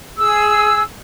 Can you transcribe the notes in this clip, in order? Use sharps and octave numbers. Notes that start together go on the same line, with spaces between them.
G#4 E6